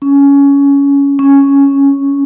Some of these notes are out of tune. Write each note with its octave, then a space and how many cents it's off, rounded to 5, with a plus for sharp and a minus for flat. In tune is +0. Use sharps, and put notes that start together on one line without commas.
C#4 +15
C#4 +0